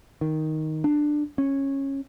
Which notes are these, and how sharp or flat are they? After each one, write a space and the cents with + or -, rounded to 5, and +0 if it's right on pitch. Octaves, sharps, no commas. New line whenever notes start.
D#3 +5
D4 +15
C#4 -15